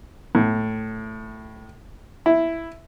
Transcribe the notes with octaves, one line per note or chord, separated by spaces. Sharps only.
A2
E4